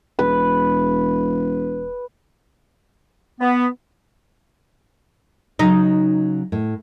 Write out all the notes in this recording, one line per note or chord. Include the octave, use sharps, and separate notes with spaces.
E1 B4
B3
C#3 F#3 D#4
A2